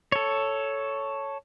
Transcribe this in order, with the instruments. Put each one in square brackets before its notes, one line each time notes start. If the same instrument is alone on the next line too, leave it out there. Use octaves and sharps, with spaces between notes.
[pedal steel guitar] A4 C#5